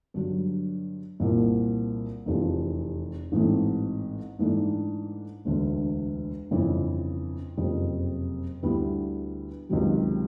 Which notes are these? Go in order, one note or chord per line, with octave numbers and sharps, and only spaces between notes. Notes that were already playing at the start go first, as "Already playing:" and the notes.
G2 D3 F#3
C2 A#2 F3 A#3
F1 E2 C3 F3
A1 G#2 E3 A3 C4
G#2 E3 A3 D4
E1 D2 D3
G1 F2 C#3 E3
F#1 F2 C3
D2 D3 G3 B3 E4
C#2 C3 D#3 F#3